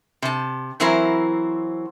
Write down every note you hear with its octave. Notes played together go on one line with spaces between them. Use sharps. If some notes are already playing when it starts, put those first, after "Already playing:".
C3 A5
E3 F#3 C4 E4 A#4 C5